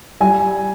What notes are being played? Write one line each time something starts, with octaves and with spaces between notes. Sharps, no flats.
G3 G#5